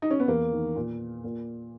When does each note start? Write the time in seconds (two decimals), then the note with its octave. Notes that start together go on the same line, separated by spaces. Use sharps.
0.02 D#4
0.10 C#4
0.20 B3
0.28 E2 A#3
0.52 D#3
0.76 A#2
1.24 A#2